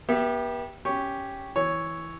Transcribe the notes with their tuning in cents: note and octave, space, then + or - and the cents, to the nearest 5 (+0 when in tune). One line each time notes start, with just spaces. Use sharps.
B3 -40 G4 +0 E5 +0
C#4 +0 G4 +0 C#6 +0
E3 -5 C#5 +0